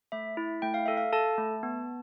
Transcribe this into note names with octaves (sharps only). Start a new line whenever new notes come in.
A3 E5
E4
A3 G5
F5
A4 E5
F5
A4 A5
A3
B3